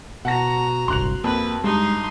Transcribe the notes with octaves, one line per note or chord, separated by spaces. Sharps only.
B2 F#4 F#5 A5 A#5 A#6
D1 G1 C2 C6 F#6 F7
F2 A#3 B4
G2 G#3 D#4 C6